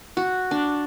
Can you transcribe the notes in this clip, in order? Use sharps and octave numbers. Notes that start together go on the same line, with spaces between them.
F#4
D4